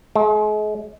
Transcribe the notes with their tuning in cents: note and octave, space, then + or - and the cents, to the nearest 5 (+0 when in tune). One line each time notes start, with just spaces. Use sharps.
G#3 +40